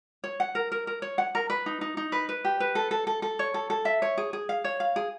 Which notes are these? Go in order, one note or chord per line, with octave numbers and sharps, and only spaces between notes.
C#5
F#5
A#4
A#4
A#4
C#5
F#5
A#4
B4
D#4
D#4
D#4
B4
B4
G4
B4
A4
A4
A4
A4
C#5
A4
A4
E5
C#5
G#4
G#4
F5
C#5
F5
G#4